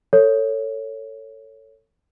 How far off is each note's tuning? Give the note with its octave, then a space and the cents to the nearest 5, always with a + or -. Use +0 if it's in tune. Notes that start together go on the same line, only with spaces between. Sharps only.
A4 +25 C#5 +0